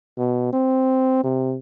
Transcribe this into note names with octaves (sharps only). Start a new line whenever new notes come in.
B2
C4
C3